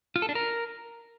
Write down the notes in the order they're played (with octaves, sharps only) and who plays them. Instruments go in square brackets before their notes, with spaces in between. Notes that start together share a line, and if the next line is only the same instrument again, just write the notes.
[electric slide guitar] F4
A4
D4
A#4